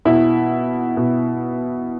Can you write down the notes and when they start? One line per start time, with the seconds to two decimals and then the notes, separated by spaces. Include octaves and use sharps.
0.05 B2 E4
0.97 B2